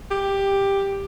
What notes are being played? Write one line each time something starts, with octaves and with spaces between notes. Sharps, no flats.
G4